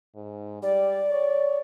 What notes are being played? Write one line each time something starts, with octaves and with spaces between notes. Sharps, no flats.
G#2
G3 D5
C#5